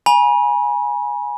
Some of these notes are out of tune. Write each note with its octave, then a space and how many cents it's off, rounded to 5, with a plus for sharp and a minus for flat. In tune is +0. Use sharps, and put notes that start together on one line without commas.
G#5 +0 B5 -40